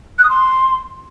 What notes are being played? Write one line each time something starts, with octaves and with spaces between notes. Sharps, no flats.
F#6
D#6
C6